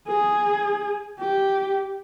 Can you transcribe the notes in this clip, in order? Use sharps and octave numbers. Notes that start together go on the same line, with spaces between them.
G#4
G4